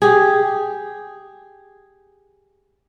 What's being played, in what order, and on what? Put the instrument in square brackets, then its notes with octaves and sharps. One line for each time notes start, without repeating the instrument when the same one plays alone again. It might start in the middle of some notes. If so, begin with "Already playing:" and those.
[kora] G4 G#4